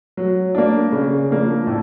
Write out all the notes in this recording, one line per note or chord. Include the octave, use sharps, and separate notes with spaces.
F#3
A#3 D4
C#3
F3 A#3 D4
A2